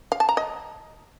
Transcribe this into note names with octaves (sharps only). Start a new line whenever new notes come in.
F5
A5
A#5
D#5